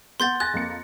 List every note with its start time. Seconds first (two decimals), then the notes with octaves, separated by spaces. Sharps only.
0.20 B3 F#5 C6 G6 A6
0.40 G#5 F#6 A6 A#6
0.54 F2 A#3 C#7